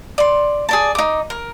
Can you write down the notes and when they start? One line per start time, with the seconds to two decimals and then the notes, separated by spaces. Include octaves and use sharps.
0.18 D5 C6
0.69 G#4 D5 A5
0.95 D#4 D6
1.30 A#4